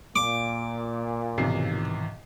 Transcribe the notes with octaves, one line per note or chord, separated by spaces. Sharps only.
A#2 D6
B1 G#2 C3 D#3 E3 C7